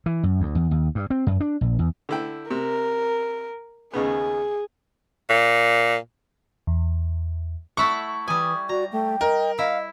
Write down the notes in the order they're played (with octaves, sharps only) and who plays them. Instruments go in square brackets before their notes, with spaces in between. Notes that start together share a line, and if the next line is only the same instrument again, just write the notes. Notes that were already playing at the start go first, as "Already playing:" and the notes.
[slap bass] E3
F#2
D2
E2
D#2
G2
C4
F#2
D4
A#1
E2
[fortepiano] D3 E4 G5
[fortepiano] C3 [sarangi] A#4
[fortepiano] D#2 C#3 B3 [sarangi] G#4
[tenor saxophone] A#2
[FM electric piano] E2
[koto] A3 E4 F#5 [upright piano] C#6
[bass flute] E3 [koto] G3 G#5 [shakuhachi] D#6
[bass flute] F#4 [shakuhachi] D5 [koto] A#5
[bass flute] A3 [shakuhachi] G5
[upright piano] A#4 [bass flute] D#5
[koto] E4 [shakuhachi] D#5 [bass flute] F5